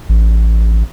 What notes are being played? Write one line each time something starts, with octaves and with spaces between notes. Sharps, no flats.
A1